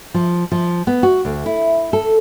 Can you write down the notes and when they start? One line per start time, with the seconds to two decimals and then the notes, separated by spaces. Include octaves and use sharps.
0.14 F3
0.52 F3
0.87 B3
1.03 F#4
1.25 D2
1.46 E4
1.93 A4